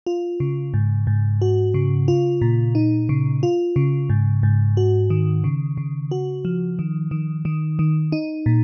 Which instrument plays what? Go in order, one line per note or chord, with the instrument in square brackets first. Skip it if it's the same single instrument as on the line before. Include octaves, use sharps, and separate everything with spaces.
[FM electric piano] F4
C#3
G#2
G#2
F#4
C#3
F4
A#2
D#4
C#3
F4
C#3
G#2
G#2
F#4
D#3
C#3
C#3
F#4
F3
D#3
D#3
D#3
D#3
D#4
A#2